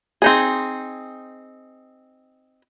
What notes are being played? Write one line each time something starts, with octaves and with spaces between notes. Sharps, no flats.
C4 D#4 G#4